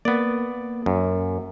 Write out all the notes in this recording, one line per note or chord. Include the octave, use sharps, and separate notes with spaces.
A#3 B3 D5
F#2